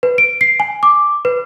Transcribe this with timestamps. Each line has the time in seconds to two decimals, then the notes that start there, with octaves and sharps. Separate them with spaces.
0.03 B4
0.18 D7
0.41 C7
0.60 G#5
0.83 D6
1.25 B4